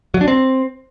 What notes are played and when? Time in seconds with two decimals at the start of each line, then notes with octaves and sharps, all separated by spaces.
0.14 F#3
0.21 D4
0.28 C4